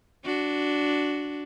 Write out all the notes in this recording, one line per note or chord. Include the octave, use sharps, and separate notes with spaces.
D4 F#4